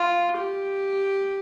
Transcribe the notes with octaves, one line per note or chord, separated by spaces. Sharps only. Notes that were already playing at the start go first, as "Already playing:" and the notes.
Already playing: F4
G4